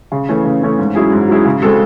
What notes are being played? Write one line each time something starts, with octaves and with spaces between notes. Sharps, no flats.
C#3
E3 A3 C#4
C#3
E3 A3 C#4
G#2
F#3 C#4 E4 G#4
G#2
F#3 C#4 E4 G#4
C#3
G#3 C4 F#4 A4